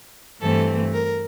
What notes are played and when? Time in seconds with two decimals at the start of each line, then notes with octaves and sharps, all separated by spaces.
0.41 G2 E3 A3 C4 A4
0.93 A#4